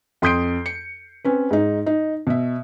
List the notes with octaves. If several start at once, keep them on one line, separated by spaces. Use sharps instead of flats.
F2 C6 D#6 G6 C7 D7
C#7
C4 C#4 B4
G#2 D#4
D#4
B2 E5